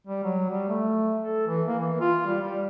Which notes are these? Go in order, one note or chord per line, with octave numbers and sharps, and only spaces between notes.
G3
F#3
G3
A3
A4
E3
A#3
E3
F4
G3
G3